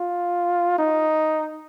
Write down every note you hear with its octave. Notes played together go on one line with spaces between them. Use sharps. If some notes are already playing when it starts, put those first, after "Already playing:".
Already playing: F4
D#4